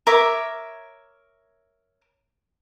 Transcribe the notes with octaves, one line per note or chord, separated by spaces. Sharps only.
A#4 C#5 E5 D6